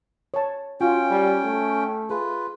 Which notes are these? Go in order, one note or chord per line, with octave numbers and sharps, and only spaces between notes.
C#5 A5
C#4 F4 F#4 G5
G3
A3
F4 G#4 B4